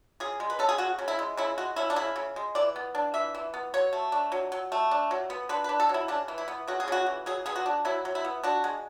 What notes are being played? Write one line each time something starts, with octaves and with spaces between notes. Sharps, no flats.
C#3 G#4
G#3
B4
C#4 A4
G#4
C#3 F#4
C#3
E4
G#3
C#3 E4
G#3 F#4
C#4 E4
D4
C#3 E4
C#3
G#3
E3 D5
B3
D4
E3 E5
E3
B3
F#3 C#5
A3
D4
F#3
F#3
A3
D4
F#3
B3
D3 B4
B4
D4
A4
F#3
E4
C#3 D4
E3
E4
B3
C#3 F#4
G#4
C#3 F#4
E3
F#3 G#4
B3 G#4
F#4
D4
F#3 E4
F#3
E4
B3
D4 F#4
G#3